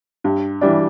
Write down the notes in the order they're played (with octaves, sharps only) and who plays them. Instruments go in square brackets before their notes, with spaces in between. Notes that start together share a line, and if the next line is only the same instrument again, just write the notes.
[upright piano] G2
E3 G3 D4